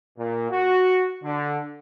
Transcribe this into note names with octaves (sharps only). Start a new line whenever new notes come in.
A#2
F#4
D3